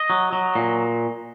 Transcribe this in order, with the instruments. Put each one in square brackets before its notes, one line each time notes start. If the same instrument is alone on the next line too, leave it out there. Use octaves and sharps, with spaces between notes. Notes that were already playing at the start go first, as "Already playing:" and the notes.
Already playing: [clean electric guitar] D#5
F#3
F#3
A#2